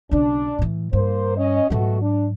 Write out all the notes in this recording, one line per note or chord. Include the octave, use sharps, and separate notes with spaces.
B1 C#3 D4
A2 E3
G2 A#3 C5
C#4 D#5
G#2 B2 F#3 A3 F#4
D4